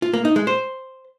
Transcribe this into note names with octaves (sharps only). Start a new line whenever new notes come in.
F4
A#3
D#4
G#3
C5